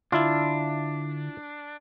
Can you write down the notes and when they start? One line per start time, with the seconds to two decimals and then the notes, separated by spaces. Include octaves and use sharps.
0.12 D3 D4 E4 F4